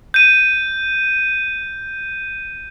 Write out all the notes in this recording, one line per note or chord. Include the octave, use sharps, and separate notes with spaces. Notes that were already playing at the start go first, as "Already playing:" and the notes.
G6 D#7